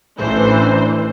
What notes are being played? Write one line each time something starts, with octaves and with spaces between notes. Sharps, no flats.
A1 E3 D4 C5